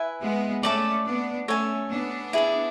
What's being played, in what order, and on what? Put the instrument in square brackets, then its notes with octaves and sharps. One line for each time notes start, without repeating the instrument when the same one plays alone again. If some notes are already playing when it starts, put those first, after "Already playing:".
Already playing: [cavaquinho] E4 B4 E5 G#5
[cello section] G#3 B3
[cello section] A3 C#4 [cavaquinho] D5 A5 D6
[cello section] B3 D4
[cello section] A3 C#4 [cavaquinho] A4 C#5 G#5
[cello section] B3 D4
[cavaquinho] E4 G#4 D5